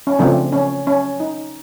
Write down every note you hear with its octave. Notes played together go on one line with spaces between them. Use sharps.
C#4
C#3 F3 A3 C4 D4
C#4
C#4
D#4